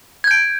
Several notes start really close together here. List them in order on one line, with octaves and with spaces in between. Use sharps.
G#6 G6 D7